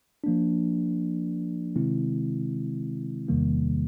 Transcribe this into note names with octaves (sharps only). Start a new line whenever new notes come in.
F3 A#3 D4
C3 D#3 G#3 C4 E4
E2 C3 D#3 G3 A#3